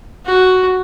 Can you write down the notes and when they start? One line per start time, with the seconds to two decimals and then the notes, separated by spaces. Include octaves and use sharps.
0.25 F#4